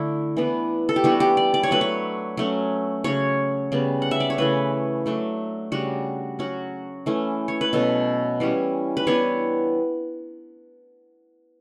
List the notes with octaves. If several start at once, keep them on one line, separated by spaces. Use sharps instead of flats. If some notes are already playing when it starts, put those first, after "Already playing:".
Already playing: D3 A3 D4 E4
E3 B3 D4
A4
G4
E3 G3 B3 D4 F#4
G4
D5
D5
C#5
F#3 A3 D4 B4
C#5
F#3 A3 C#4
C#3 F#3 C#4 C#5
C#3 G3 B3
F#5
E5
D5
C#5
C#3 E3 A3 B4
F#3 A3 D4
C#3 G3 D4 F#4
F#3 C#4 F#4
E3 A3 C#4
C#5
B4
B2 F#3 C#4 A4
E3 G3 C#4
B4
E3 B3 D4 C#5